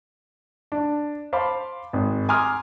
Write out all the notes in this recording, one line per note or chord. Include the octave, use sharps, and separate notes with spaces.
D4
C5 F5 A5 B5 C6 D6
G#1
G#5 A#5 C6 D6 D#6 F6